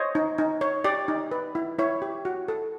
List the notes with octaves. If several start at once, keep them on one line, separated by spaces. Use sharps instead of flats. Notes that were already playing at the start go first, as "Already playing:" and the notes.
Already playing: C5 C#5 D#5
D#4
D#4
C#5
G4 D5
D#4
B4
E4
E4 C#5
G4
F#4
A4